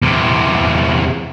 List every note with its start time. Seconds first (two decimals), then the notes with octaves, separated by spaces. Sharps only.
0.02 E2 C3